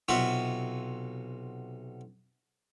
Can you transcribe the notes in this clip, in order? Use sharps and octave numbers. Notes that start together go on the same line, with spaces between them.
B1 C3 F4 F#4 E5